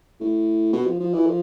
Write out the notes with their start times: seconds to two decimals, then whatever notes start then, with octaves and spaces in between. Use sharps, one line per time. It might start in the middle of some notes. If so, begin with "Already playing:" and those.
0.21 A2
0.73 B2
0.86 F3
1.00 F3
1.14 E3
1.27 F3